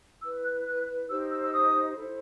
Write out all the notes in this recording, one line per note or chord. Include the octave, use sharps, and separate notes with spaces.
E4 B4 E6
F#6
F#6
D#4 G4 C5 E6
E6
E6
D#6
E4 A4 C5